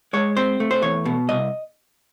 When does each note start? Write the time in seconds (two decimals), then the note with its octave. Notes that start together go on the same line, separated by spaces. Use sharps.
0.13 G#3 C#5
0.37 C4 C5
0.60 A3
0.71 C5
0.82 E2 C#5
1.05 B2
1.29 C2 D#5